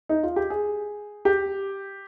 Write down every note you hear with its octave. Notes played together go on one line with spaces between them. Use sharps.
D#4
F4
G4
G#4
G4